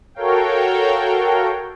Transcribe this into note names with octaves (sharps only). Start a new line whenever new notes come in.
F#4 A4 A#4 C#5 F5 G5